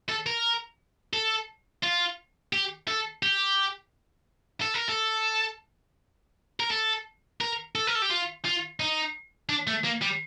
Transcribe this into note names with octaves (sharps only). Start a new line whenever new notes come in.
A4
A#4
A4
F4
G4
A4
G4
A4
A#4
A4
A#4
A4
A#4
A4
A#4
A4
G4
F4
F4
D#4
D4
A3
A#3
G3